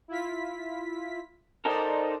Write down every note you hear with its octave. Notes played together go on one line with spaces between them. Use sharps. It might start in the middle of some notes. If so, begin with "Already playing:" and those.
E4 F4 B6
D#4 A4 A#4 C5 D5 D#5